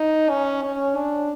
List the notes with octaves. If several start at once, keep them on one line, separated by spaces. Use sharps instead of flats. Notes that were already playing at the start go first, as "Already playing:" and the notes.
Already playing: D#4
C#4
C#4
D4